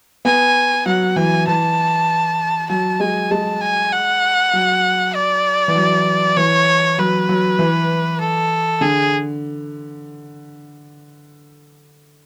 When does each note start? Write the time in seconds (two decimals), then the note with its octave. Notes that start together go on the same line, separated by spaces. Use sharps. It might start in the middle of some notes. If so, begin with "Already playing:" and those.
0.25 B3 G#5
0.86 F#3 F#5
1.16 E3 G#5
1.47 E3 A5
2.70 F#3 A5
3.00 G#3 G#5
3.31 G#3 A5
3.61 G#5
3.93 F#5
4.53 F#3
5.15 D5
5.68 E3
5.75 F#3
6.37 E3 C#5
6.98 F#3 B4
7.29 F#3
7.59 E3
8.20 A4
8.81 D3 G#4